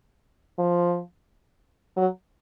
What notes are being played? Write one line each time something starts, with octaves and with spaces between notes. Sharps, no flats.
F3
F#3